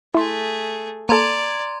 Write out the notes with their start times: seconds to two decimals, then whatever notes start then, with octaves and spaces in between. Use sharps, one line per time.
0.14 A3 E4 G#4 C6
1.09 A#3 A4 D5 A#5 C6 G#6